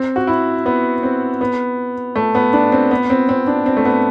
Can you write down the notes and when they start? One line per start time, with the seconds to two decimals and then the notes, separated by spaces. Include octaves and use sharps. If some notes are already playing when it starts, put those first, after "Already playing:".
Already playing: C4
0.16 F#4
0.27 E4
0.66 B3
1.03 C4
1.41 B3
2.16 A3
2.35 B3
2.53 D4
2.72 C4
2.91 B3
3.10 C4
3.29 C4
3.47 D4
3.66 C4
3.77 A3
3.85 B3